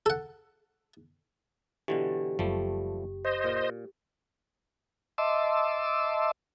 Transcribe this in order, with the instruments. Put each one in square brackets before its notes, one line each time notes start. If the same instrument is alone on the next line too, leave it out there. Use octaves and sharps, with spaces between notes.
[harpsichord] A4 F#5
[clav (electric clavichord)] B2 D3 E3 [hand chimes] G4
[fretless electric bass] F#1 [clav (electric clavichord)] F3 G3 A3
[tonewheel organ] C5 D#5
[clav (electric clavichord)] A#2
[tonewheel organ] D#5 E5 A5 C6 D6 E6